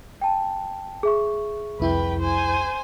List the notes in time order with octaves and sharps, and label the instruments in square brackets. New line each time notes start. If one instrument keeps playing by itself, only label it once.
[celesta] G5 A5
G#4 E5 C#6
[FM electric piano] C2 F2 E4 [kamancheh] B4 G5
[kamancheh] C5 G#5